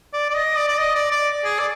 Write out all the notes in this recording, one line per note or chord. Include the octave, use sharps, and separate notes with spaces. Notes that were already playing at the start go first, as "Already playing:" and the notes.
D5
D5
D#5
D5
D5
D#5
D5
D5
G#4
D5